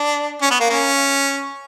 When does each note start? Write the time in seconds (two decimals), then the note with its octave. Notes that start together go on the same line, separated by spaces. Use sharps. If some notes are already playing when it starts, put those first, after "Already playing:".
Already playing: D4
0.41 C#4
0.50 B3
0.60 A#3
0.70 A#3 C#4